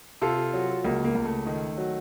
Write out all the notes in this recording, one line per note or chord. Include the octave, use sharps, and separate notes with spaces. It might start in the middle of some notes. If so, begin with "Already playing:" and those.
C3 F4 A4
F#3
C#2 A#3
A#3
C#2
A3
D#3
F#3